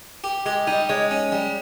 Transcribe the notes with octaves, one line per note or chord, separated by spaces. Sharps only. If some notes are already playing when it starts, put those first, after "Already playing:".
G4
G#3 G4
G3 D#4
G#3 C#5
C#4
G3